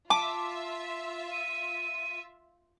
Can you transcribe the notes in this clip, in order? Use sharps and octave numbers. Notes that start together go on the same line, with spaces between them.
F4 E5 A5 D6
D#7